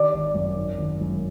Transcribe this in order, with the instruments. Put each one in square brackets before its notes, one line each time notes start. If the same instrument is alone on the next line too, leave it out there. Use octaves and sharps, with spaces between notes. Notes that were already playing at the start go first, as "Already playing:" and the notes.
Already playing: [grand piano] D#3 [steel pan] D5
[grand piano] G#1
F#2
D#3
G#1
F#2